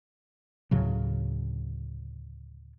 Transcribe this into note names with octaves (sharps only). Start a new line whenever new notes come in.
D2 A2 C#3 F#3